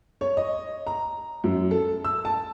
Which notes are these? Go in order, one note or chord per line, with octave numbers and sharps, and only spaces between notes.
C#5
D#5
A#5
F#2
A4
E6
A5